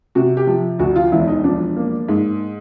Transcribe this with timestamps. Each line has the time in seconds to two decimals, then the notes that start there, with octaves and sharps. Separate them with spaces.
0.15 C3 F#4
0.37 G4
0.47 F3
0.79 D2 F#4
0.96 F4
1.12 E1 E4
1.28 D#4
1.44 F3 D4
1.76 A#3
2.09 G#2